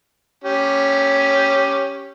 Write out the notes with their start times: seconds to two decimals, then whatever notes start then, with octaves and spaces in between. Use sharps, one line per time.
0.44 C#4 G4